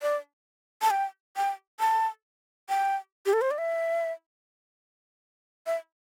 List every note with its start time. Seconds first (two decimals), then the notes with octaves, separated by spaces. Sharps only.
0.02 D5
0.82 A5
0.91 G5
1.36 G5
1.80 A5
2.69 G5
3.26 G4
3.33 A4
3.41 C5
3.51 D5
3.58 E5
5.66 E5